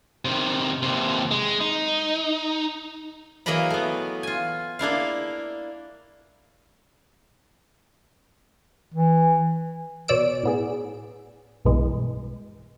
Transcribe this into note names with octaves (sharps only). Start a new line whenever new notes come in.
C3 D#3
D#2 C3
G#3
D#4
E3 F#3 A#3 D#5 A#5 B5
A3 B3
F4 G#5
A#3 D4 E4 F5
E3
B2 C#5 D5 E6 D7
A2 B3 G#4
B1 G2 B2 E3 G#3